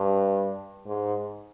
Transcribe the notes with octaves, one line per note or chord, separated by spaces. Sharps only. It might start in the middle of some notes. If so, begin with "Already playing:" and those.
Already playing: G2
G#2